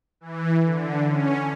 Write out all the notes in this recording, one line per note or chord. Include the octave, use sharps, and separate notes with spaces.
E3
D3
C#4